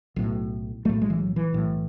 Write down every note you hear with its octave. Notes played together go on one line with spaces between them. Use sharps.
B1 A2
B1 A2 A3
G#3
E3
F#3
E3
B1 A2